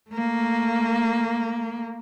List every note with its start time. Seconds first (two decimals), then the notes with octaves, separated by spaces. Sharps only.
0.11 A3 A#3